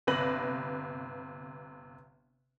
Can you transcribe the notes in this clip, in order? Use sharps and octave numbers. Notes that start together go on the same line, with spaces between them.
G1 C3 B4 A#6 F#7